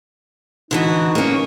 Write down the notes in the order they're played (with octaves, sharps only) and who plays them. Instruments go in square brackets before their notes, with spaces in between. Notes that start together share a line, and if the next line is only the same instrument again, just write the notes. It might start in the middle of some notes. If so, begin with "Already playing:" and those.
[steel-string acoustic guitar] D3 E3 F#4 [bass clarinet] D#4
[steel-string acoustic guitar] A#3 C#4